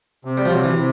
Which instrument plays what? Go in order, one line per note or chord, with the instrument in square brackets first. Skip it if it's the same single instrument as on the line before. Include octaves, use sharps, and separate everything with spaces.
[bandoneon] C3
[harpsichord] G3
F3
[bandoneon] C3 [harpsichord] F#3
[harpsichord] E3
[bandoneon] C3